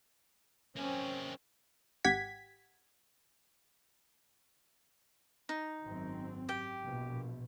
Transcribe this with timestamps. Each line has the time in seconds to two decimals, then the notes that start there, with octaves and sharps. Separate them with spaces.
0.77 A#3 C4 C#4 G#4
2.04 G#1 G4 F#5 G#6 B6
5.49 D#4
5.82 G#1 F#2 C4
6.49 G4 G5
6.85 A#1 B2